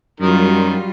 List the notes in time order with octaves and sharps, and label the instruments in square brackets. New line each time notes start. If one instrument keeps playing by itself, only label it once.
[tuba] F#2 [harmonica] D#3 A#4 [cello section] F#3 G3 F4